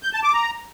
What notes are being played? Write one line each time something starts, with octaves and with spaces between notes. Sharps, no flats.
G6
A5
D6
A#5